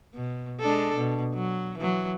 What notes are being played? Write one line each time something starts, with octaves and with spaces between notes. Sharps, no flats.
B2
G#3 D4 A4
B2
F#3
E3 F#3